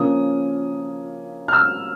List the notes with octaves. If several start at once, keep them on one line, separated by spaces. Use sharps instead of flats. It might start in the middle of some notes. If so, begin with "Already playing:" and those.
Already playing: C#3 F3 A#3 C#4 D#6
F6
E6